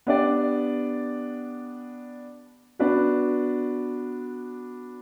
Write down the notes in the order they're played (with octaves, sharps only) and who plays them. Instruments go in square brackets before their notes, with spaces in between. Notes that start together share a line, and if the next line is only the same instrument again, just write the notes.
[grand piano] B3 D4 G4 D5
B3 D4 F#4 B4